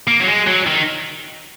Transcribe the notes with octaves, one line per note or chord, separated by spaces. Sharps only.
A#3
F#3
G#3
F#3
D#3